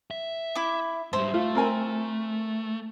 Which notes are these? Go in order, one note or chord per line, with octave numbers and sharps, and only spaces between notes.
E5
E4 D6
G#2 G3 C5 E5 C6
A3 F4
C4 A#4 G#5